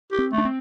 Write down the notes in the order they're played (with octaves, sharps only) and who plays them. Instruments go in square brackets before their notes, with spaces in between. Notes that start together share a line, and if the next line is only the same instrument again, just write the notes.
[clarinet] G4
[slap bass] C4
[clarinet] A3
[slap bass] D4
C4